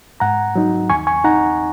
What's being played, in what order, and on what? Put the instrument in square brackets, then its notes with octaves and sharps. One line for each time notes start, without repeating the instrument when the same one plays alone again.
[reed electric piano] G#2 F#5 A#5
F#3 D#4
D#2 G#5 C#6
G#5 C#6
D#4 F#5 A#5